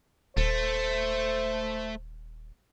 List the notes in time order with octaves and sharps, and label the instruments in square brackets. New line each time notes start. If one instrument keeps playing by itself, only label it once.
[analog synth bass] D#1 [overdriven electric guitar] A3 [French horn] C5